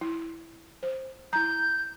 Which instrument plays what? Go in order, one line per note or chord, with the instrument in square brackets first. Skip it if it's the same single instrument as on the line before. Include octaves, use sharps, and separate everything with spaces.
[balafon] E4
C5
[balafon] E4 A#5 [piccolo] G6